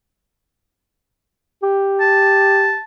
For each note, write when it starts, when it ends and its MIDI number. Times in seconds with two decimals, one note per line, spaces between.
1.62 2.75 67
2.00 2.84 81